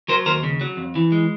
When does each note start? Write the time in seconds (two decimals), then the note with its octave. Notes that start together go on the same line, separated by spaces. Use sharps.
0.08 F#3 A#4 C5
0.26 D#2 A#4 C5
0.43 C#3
0.61 F#3
0.77 F2
0.95 E3
1.12 G#3